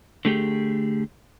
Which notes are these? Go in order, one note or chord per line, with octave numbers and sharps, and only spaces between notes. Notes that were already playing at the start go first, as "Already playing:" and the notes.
D3 A3 G4 G#4